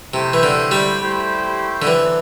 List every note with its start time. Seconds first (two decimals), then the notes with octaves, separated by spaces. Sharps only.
0.14 C3 A3 E4 G4 C5
0.33 E3
0.43 D3
0.71 G3
1.01 A3 E4 G4 C5
1.82 D3
1.86 E3 C4 A4 D5